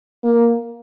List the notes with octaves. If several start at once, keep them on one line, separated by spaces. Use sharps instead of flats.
A#3